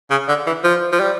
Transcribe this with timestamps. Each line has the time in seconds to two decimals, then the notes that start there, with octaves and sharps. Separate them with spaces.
0.11 C#3
0.28 D3
0.47 E3
0.64 F3
0.93 F3
1.00 G3